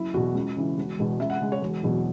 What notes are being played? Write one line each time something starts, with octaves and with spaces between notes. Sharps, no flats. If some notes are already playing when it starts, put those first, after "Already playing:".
Already playing: F#1 E4
E2 B2 F#4
C#2
C#3 E3
E1
E2 B2 G#3
C#2 E5
F#5
C#3 G#3
C#5
E1
E2 B2 F#3